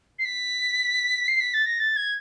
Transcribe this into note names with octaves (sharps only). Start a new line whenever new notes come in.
C7
B6
C7
B6
A6
A#6
A6
G#6